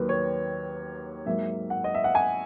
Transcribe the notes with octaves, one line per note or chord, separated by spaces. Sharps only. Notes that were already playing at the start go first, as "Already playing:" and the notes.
Already playing: D#2 D#3 F#3 A#3 B4
C#5
G#2 F#3 A#3 E5
F#5
D#5
E5
F#5
G#5